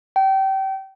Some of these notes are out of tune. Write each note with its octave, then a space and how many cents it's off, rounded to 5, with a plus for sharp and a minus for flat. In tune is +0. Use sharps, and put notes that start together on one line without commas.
G5 -30